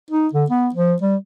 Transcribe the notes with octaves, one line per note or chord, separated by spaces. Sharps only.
D#4
D3
B3
F3
G3